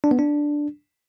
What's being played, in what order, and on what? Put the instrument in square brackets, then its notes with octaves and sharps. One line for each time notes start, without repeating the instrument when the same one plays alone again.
[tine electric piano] D4
B3
D4